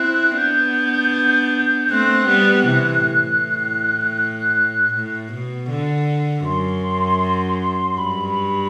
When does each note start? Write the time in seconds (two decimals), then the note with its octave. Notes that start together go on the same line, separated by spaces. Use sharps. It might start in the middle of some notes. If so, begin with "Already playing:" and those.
Already playing: C4 E4 F#6
0.38 B3 D4 G6
1.90 A3 C4 F#6
2.28 G3 B3
2.66 C3 E3
3.04 A2
4.18 F#6
4.57 F#6
4.94 A2
5.33 B2
5.70 D3
6.46 F#2 C6
7.98 G2 B5